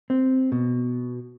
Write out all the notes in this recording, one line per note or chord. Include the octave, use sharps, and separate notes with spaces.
C4
B2